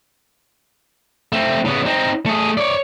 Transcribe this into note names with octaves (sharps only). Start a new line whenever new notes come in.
A3 C4
C#3 B3
C4 D#4
A3 G#4
C#5 D5